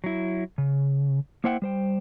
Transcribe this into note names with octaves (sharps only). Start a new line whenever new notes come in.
F#3 E4
C#3
A#3 E4 C5 E5 F#5 G5
G3 C5 G5